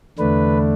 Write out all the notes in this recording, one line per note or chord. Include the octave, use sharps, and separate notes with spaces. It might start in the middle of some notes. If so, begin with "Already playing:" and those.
E2 D3 A3 D4 B4